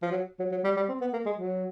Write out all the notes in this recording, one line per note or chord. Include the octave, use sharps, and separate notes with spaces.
F3
F#3
F#3
F#3
G3
G3
C4
B3
A#3
G#3
F#3